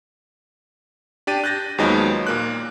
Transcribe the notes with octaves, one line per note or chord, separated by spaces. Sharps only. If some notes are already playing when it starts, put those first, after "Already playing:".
D4 G4 A6 D#7
F#6 G6 A6 A#6
D#2 F3 F#3 G#3 B3 D#4
A#2 A#3 F#6